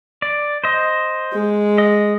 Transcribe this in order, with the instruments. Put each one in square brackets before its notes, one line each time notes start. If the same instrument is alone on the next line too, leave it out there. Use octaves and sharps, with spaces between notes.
[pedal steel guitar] D5
C5 D#5
[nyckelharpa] G#3
[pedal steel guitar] D#5